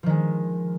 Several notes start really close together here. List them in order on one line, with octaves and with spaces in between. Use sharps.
F3 D#3 G#3